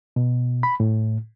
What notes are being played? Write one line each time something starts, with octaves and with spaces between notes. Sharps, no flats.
B2
B5
A2